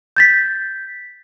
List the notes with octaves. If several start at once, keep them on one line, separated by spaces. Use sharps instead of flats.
G6 A6 B6